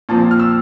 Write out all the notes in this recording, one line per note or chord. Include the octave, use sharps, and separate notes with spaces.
A#2 F3 C4 A5
F6
E6